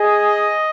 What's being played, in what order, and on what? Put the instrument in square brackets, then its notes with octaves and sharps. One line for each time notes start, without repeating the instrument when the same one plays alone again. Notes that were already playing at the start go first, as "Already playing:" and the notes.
Already playing: [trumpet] G#4 [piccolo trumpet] D#5